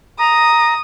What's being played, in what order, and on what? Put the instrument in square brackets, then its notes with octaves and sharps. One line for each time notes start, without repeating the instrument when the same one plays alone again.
[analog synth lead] A#5 [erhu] D#6